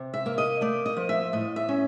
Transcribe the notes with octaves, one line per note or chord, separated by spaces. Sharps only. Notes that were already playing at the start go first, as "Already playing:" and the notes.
Already playing: C3
E5
A#3
D#5
A3 D5
D#5
F3
E5
A2 D#5
E5
C#4